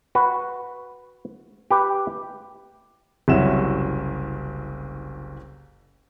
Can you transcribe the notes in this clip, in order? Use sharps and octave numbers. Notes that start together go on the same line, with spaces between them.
F#4 B4
G4 B4 G5
F#1 C2 C#4 E4 F#4 E7